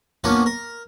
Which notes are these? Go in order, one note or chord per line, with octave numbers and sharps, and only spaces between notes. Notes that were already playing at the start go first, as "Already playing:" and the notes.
A#3 B3 C#4 D4 F4 B4
A#4